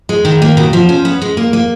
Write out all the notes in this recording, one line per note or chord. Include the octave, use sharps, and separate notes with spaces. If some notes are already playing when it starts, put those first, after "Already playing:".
G#3
D#3
A#3
B2
F3
C#4
B3
G#3
A#3
A#3